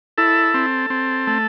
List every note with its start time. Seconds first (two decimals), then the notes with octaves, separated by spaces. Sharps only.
0.18 E4 A4
0.54 C4
0.90 C4
1.27 A3